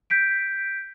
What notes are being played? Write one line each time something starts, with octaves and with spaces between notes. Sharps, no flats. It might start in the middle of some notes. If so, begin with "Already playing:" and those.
G6 B6 D7